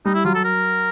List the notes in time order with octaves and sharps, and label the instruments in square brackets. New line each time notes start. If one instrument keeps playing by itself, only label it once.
[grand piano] G3 [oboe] D#4
[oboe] E4
[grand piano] F#3 [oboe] F4
[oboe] A4
A#4